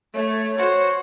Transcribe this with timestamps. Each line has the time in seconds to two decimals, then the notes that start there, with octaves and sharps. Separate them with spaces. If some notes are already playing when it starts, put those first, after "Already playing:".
0.14 A3 C#5
0.59 F#4 C5